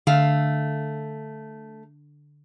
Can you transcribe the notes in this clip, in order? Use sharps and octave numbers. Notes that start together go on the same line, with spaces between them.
D3 A3 F5